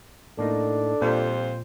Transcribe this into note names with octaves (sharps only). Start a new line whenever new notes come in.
A2 A#3 D4 D#4 A4
F2 A#2 G3 C5